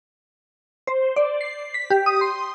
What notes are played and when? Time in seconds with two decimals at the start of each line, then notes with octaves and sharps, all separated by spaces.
0.87 C5
1.16 D5
1.41 C7
1.74 B6
1.90 G4
2.06 D#6
2.21 C6